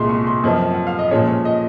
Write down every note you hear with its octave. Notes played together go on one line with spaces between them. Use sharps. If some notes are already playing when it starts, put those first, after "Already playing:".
Already playing: C2 A#2 G#3 C6
C#6
C6
F#2 F3 C4 D#5
F#5
F5
D#5
A#2 F3 G#3 C#4 C#5
C#5
D#5